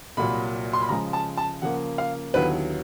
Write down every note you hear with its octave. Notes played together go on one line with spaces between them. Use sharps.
C2 A#2 F#3 B5
C6
B5
C#3 F3 G#3 A#5
A5
A5
C#3 F3 A#3 F#5
F5
D#2 D3 F#3 B3 E4 B4